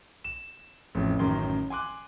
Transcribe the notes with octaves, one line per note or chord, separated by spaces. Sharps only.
E7
A1 F2
A1 F#2 D#3 C6
G#5 C6 D6 F#6